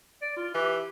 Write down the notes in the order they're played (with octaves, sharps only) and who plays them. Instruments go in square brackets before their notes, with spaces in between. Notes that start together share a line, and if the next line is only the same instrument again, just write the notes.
[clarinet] D5
F4
[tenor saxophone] E3 [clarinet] G4